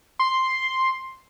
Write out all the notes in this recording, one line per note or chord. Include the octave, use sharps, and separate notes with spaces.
C6